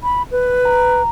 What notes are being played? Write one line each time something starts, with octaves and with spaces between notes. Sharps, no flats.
B5
B4
A#5